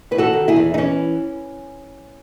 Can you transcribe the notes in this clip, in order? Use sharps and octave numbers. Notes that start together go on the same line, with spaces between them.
E2 B4
F#4 A4
D#3
E4 G#4
E2
D#4
E3 C#4